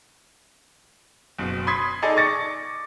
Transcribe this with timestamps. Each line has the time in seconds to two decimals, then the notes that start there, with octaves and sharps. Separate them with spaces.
1.38 F#1 B2
1.67 B5 C6 D#6 G#6 B6 C7
2.02 D#4 G#4 A4 D5 D#5 G#5
2.16 C#6 D6 A6 A#6 C#7